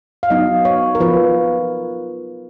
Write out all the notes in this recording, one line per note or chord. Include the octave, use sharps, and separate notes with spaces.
F5
F#3 B3 D#4 D#5
C#5
A#4
F3 B3 F4 B4